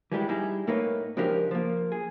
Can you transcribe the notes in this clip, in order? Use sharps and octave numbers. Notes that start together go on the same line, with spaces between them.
E3 F3 G3 G#3 E4
G3 D#4 E4 G#4
A2 A3 A#3 D#4 B4 C#5
C#2 F3 D4 D#4 G4 A#4
F3 A#3
G#4